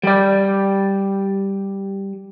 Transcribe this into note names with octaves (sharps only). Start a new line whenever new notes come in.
G3 D5